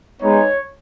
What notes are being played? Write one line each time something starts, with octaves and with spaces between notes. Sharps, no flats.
G#3 B3 D#4 C#5